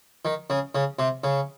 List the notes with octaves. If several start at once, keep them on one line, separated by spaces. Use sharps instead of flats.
D#3
C#3
C#3
C3
C#3